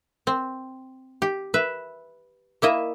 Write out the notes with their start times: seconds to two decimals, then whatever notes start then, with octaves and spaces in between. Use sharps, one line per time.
0.27 C4
1.22 G4
1.54 B4 E5
2.62 A#3 E4 D#5 E5